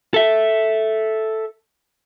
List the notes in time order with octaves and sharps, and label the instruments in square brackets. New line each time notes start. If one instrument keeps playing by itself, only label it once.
[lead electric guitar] A4 E5